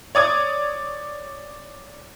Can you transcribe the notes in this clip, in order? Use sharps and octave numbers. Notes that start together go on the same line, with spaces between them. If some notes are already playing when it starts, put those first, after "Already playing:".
C#5 D5 D#6 G#6